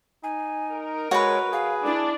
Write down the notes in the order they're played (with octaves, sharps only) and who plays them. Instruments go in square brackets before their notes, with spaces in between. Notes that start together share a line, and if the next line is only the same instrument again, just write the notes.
[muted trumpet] D#4 [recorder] G#5
[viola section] A#4
[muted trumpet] G#3 [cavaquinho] F#4 B4 [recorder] C#5
[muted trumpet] G#4 [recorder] F5
[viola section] D4 [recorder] E4